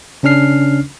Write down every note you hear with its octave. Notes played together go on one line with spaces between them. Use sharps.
C#3 C#4 D4 F6 C7